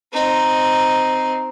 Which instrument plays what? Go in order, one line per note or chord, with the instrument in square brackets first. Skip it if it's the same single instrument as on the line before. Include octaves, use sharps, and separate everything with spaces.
[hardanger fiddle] C4 D#4